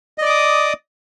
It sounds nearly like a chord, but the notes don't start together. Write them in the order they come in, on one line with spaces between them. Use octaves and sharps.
D#5 D5 D6 D#6